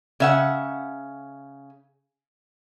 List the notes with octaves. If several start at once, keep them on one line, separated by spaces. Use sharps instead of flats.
C#3 E5 F#5